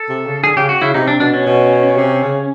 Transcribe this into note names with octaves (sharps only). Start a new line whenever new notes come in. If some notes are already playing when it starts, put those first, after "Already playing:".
Already playing: A4
C3
C#3
D3 G#4
C#3 G4
F#4
C#3 E4
C3 D#4
D4
B2 D4
C#4
B2
C3
C#3